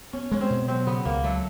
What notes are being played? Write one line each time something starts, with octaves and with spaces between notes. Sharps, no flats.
B3 C#4
G#3 C#4
C4
B2
F#3 C4
C#3 B3
C#2 A#3
F#3 A3